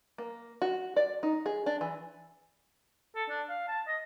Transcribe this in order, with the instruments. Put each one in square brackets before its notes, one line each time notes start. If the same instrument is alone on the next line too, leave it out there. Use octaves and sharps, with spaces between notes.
[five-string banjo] A#3
F#4
D5
D#4
G#4
D4
E3
[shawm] A4
D4
F5
A5
D#5